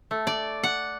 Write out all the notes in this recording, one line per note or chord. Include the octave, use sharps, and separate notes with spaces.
A3
D5
F#5